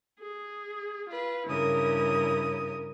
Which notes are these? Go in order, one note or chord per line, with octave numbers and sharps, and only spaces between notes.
G#4
F4 B4
G2 C#3 E4 A#4 D#6